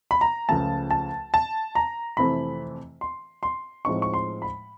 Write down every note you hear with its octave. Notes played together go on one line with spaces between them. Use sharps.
B5
A#5
C#2 C#3 F3 A3 A5
A5
A5
A#5
F2 C3 E3 A3 C4 B5
C6
C6
A2 F3 G#3 C4 D#4 C#6
C#6
C6
B5